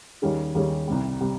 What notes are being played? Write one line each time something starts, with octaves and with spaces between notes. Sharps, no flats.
D#2 D#3 G3 C#4 G#4
D#2 D#3 G3 C#4 G#4
C2 C3 G3
C3 G3